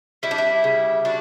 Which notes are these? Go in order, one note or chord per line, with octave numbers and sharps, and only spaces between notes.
G3 E4
D4
E4
C#3
D4 F#4